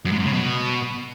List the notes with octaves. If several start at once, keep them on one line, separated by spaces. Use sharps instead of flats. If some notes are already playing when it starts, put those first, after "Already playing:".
F#2
G#2
F#2
C#3
B2